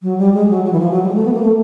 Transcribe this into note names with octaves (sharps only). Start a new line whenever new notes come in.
F#3
G3
G#3
F#3
F#3
E3
F3
F#3
G3
G#3
A3
B3
A#3
A3